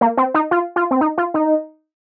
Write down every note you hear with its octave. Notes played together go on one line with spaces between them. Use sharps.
A#3
C4
D#4
F4
F4
C4
D#4
F4
D#4